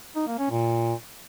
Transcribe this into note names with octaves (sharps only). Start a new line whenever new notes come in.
D#4
A#3
C#4
A#2